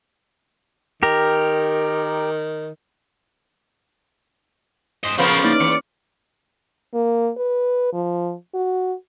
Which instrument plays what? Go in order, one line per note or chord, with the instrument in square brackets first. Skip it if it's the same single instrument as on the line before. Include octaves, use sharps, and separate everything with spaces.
[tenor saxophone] D#3 [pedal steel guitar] G4 A#4
[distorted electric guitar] C5 D#5
[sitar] C#3 F3 B3 [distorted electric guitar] A#4 C5
[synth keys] A#3 D#4 E4 [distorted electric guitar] D5
[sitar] E2 [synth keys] C#7
[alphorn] A#3
B4
F3
F#4